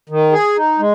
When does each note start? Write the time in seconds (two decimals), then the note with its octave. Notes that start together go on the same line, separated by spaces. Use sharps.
0.09 D#3
0.32 G#4
0.56 D#4
0.79 G#3